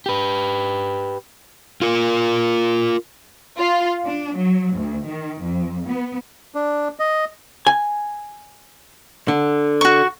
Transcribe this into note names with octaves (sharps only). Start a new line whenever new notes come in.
G4 B4
F4 A#4
F4
D4
F#3
D2
D#3
F2
B3
D4
D#5
G#5
D3
F#4 C#6